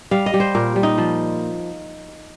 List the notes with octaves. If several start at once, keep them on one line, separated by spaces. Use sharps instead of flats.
G3 F5
D#5
G3
C5
A#2 A#4
G3
D#4
F3